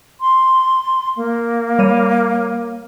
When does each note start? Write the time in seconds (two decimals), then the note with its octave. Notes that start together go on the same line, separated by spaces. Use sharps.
0.20 C6
1.17 A#3
1.79 G3 C#5 D#7